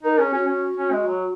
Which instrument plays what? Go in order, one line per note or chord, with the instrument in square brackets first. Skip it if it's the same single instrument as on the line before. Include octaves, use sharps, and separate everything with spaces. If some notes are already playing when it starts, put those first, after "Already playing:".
[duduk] D#4 [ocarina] A#4
[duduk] C#4 [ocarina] G#4
[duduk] C#4 [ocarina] F#4
[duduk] C#4
C#4
G#3
F#3